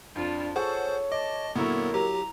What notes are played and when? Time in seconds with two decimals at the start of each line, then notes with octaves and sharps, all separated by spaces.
0.16 F2 D4 F4 A5
0.56 G#4 A4 C5 C#5 F#5 C#6
1.12 D#5 A5 D6
1.56 A#2 D3 F#3 B3 E4 A#4 C#5
1.94 F#3 G4 A#5